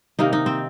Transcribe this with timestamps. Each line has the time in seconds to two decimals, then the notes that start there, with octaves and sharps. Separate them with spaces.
0.19 C3 D#3 A#3 D#4
0.33 D#4
0.46 C4